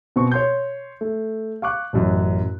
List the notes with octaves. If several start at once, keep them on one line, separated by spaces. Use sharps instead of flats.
B2 C4 C#6
C#5 C6 G6
A3
F5 C#6 D6 F#6
A1 F#2